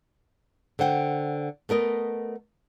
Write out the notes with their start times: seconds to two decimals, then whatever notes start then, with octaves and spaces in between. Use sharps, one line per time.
0.79 D3 C5 F#5 G5
1.69 A3 B3 A#4 D#5